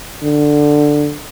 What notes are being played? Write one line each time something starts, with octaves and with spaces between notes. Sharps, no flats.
D3